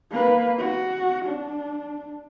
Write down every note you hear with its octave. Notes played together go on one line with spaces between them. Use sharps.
A#3 B4
F#4
D4